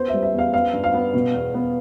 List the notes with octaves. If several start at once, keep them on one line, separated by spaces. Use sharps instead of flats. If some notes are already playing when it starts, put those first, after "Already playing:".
Already playing: B3 C5
E5
G3
E5
E2
F5
B3 F5
G2
F5
B3
B2
E2
B3